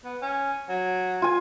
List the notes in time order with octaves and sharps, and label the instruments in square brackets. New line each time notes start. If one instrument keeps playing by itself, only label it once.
[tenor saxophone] B3
C#4
F#3
[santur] F4 G#5